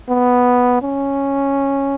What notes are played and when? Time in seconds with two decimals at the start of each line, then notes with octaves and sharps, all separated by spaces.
0.09 B3
0.82 C#4